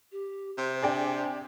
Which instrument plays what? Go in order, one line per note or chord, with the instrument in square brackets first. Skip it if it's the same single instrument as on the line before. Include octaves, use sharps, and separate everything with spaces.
[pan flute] G4
[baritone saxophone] C3 [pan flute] C5
[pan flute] D4 [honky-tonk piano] G#4 D5 G5